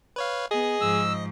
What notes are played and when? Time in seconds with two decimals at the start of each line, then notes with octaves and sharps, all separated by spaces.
0.16 B4 C#5 F5
0.51 B3 G#4 D#5
0.81 G#2 F3 E6